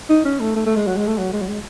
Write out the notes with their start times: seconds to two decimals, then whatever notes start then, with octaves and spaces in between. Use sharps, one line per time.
0.10 D#4
0.25 C#4
0.40 A3
0.56 A3
0.66 A3
0.76 G#3
0.87 F#3
0.97 G#3
1.07 A3
1.18 F#3
1.33 G#3
1.41 F#3
1.48 G#3